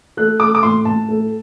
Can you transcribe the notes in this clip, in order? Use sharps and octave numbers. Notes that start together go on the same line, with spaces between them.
A3 F#6
A3 D6
D6
A2 C6
A2 A5
A3